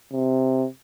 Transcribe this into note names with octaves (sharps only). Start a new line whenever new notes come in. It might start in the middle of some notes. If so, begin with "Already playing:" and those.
C3